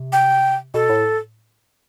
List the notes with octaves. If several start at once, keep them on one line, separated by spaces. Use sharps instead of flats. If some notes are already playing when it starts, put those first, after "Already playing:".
Already playing: C3
G5
B2 A4
A2